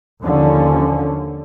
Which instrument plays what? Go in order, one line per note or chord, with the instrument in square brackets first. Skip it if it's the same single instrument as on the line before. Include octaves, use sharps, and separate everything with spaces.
[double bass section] D#2 D3 F3 C#4